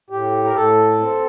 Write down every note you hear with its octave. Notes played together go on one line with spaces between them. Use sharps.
A2 G4
A#4
A2 A4
C4